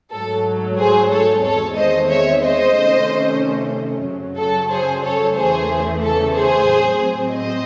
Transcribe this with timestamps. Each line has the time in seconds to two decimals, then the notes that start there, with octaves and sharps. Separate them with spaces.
0.12 G#2 F#3 A3 A4
0.79 G#4 C5
1.11 A4 C#5
1.43 E2 D#3 G#3 C4 A4 C#5
1.76 C5 D#5
2.09 C#5 E5
2.42 C5 D#5
2.74 C3 D#3 A3 C#4
4.06 F#2 C#3 F#3
4.38 A4
4.71 G#4 C5
5.03 A4 C#5
5.36 E2 C#3 E3 A3 G#4 C5
6.02 A4
6.35 G#4 C5
6.67 A2 F#3 C4
7.33 C5 D#5